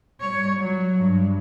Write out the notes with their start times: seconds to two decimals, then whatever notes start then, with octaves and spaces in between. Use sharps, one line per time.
0.21 G3 C#5
0.59 F#3
1.01 G2